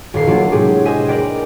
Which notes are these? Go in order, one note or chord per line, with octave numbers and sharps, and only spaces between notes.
D#1 D#2 A#2 D#3 C7
F3 F#3 A3 A#3 D4 F4
A2 C3 F#3 G#3 G4 G#4
G#4 B4 C5 D#5 E5 G#5
A#4 B4 D5 G5